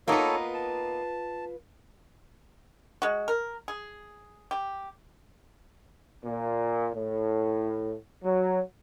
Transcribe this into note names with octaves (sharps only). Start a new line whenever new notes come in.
A#3 B3 D#4 F4 A4 B4 C#5
A5
G#3 F#4
A#4
G#4
G4
A#2
A2
F#3